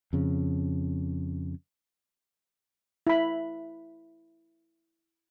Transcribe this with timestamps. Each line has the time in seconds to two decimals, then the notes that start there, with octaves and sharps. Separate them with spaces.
0.13 F2 C#3
3.07 E4 B5